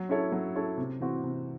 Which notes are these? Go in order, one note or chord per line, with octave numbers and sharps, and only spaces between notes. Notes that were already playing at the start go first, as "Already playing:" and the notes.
Already playing: F#3
C#4 E4 A4 C#5
F#3
C#4 E4 A4 C#5
C3
E3 C4 F#4
C3